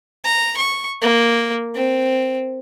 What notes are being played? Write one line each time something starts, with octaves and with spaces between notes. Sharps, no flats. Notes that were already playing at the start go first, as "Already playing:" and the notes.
A#5
C#6
A#3
C4